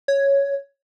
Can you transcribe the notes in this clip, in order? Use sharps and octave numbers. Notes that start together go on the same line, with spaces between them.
C#5